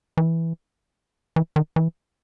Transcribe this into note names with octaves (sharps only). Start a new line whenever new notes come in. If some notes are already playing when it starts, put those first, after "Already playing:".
E3
E3
D#3
E3